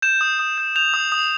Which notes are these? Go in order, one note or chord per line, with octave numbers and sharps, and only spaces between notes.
G6 E7
D#6
D#6
G6
G6 F7
D#6
D#6